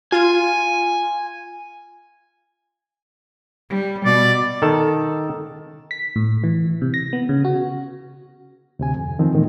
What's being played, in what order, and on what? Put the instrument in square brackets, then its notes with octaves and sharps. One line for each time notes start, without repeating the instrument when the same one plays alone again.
[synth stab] F4 [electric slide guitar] G#5
[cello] G3
[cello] B2 [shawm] D5
[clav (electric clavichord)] D#3 A4 A5
[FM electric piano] B6
A2
E3
C3
A#6
B3
C#3
F#4
[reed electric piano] D2 C3 G#5
F2
D#3 F3 C4
A#2 D#3 E3 G#3